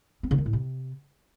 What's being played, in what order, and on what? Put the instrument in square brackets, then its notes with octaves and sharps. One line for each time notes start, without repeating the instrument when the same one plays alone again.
[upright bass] C4
C#3
D#3
A2
C3